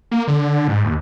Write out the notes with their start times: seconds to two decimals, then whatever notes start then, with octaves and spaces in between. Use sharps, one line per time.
0.11 A#3
0.28 D3
0.68 G#2
0.84 D#2